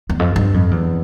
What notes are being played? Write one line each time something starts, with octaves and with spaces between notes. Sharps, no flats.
E2
F2
G2
F2
E2